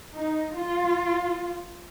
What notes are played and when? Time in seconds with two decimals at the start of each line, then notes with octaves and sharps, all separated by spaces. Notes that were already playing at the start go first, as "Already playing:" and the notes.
0.14 D#4
0.54 F4